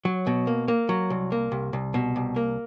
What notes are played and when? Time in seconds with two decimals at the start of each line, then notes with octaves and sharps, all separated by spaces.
0.05 F#3
0.27 B2
0.47 A#3
0.68 A#3
0.89 F#3
1.10 C2
1.32 A#3
1.52 C2
1.73 C2
1.94 B2
2.16 C2
2.36 A#3